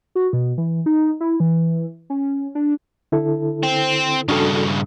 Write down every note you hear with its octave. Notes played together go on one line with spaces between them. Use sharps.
F#4
B2
E3
D#4
E4
E3
C#4
D4
D3 E4 A4
C4
G2 C#3 D4 F#4 A4